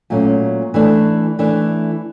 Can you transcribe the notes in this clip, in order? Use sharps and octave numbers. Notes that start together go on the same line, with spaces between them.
A#2 F#3 A3 C#4
E3 A3 D4
E3 A3 D4